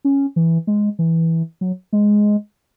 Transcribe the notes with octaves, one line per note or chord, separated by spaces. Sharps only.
C#4
E3
G#3
E3
F#3
G#3